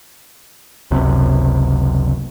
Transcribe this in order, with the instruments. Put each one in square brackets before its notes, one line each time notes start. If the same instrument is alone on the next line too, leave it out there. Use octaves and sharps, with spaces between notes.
[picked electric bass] F#1 C#2 F#2 C3